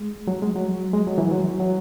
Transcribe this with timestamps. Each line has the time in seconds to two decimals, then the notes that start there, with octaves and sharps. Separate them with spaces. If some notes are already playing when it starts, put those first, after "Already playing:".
Already playing: G#3
0.28 F#3
0.42 G#3
0.56 F#3
0.93 G#3
1.07 F#3
1.18 E3
1.31 F#3
1.60 F#3